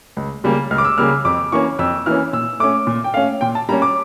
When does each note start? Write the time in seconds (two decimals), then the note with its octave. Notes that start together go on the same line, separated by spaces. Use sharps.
0.17 C#2
0.44 C#3 G3 A#3
0.71 C#2 F6
0.78 D6
0.85 E6
0.98 C#3 G3 A#3 F6
1.25 F2 D6
1.52 E3 A#3 C#4 C#6
1.79 F2 E6
2.06 E3 A#3 C#4 F6
2.33 A#2 E6
2.60 A3 D6
2.64 C#4
2.87 A#2
3.04 G5
3.14 A3 C#4 F5
3.41 A#2 G5
3.55 A5
3.69 G3 A#3 C#4 A#5
3.82 D6